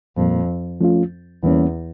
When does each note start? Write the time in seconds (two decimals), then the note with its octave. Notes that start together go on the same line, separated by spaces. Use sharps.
0.17 F2 A#2 G3 A#3
0.81 F3 A3 C#4 F4
1.43 E2 E3 G3 A#3 C#4